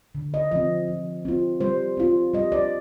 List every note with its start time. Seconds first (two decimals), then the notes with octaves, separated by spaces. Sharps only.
0.15 D3
0.34 D#5
0.51 F3 C4 D#5
0.88 F3
1.25 C4 F4
1.60 G3 C5
1.97 C4 F4
2.34 G3 D#5
2.52 D5